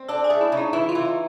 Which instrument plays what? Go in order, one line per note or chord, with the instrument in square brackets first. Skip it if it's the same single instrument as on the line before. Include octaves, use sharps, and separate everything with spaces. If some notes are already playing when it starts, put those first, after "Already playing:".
Already playing: [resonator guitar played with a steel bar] C4
[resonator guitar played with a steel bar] D4 [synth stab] A4
[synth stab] G#4
[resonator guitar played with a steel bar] A3
[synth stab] E4
[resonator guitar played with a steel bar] C#3
[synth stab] D#4
[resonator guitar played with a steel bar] E3 [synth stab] E4
[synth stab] F4
[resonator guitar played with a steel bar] E3
[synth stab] D#4